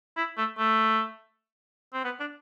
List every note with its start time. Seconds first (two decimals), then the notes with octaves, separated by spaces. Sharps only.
0.17 E4
0.37 A3
0.58 A3
1.93 C4
2.04 B3
2.20 D4